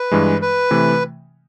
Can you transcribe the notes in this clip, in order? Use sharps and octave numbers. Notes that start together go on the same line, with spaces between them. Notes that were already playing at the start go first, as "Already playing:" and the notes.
Already playing: B4
G2 E3 G#3
B4
C3 E3 A3